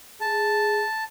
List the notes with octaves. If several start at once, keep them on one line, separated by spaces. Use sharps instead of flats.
G#4 A5